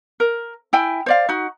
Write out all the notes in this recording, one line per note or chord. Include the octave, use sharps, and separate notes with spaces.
A#4
E4 G5 G#5
C5 D5 F5
D#4 F#4